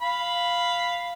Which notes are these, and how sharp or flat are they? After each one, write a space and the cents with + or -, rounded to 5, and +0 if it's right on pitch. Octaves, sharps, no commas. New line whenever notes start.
F5 +0 B5 +0